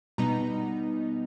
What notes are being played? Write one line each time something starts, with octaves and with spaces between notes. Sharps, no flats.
B2 G3 B3 D#4 A#5